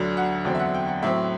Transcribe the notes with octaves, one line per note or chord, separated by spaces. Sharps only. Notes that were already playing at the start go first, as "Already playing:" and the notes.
Already playing: D2 D3 F#3
F#5
E2 D3 F#3 C4 G5
E5
F#5
G5
F#5
A2 F#3 C4 E5